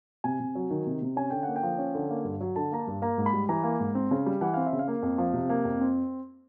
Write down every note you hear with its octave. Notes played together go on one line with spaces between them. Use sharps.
C3 G#5
C3
F#3
D#3
C3
C3
C#4 G#5
D3 G5
A#3 F#5
G5
F3
C#4
D3
A#3
G2
F#3
D3 A5
A#3 A#5
A5
G2
A#3 A#5
G#2
B5
G3
E3 A#5
A#3
G#2
C4
C#3
G3
E3 F#5
C4 F5
E5
C#3
F5
A#3
F2
F3
C3
A#3
F2
C4